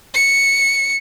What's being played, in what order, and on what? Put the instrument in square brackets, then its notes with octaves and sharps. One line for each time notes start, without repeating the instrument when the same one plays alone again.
[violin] C#7